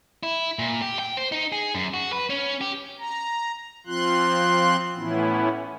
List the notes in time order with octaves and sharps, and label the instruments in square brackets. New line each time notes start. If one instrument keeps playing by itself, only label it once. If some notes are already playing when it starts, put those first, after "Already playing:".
[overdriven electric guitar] E4
A#2
G4
G5
C5
D#4
G#4
F#2
F#4
B4
C#4
G4
[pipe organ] A#5
F3 C4 F4 C6 F#6
A2 E3 B3 C#4 E4